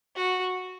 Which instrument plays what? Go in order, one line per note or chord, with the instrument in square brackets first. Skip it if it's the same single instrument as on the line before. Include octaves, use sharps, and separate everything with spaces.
[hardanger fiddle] F#4